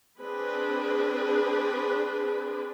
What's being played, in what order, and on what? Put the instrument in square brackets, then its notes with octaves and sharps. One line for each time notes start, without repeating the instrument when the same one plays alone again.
[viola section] C4 D4 G#4 B4